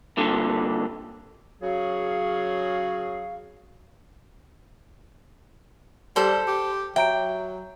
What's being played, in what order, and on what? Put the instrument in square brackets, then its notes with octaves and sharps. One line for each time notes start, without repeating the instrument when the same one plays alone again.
[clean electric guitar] G2 A#2 D3
[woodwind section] C#3 F#3 F#4 G#4 F5
[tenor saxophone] G3 [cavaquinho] A4 C5
[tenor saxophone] G4
[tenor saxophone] F#3 [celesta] E5 A#5 D7 [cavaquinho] G5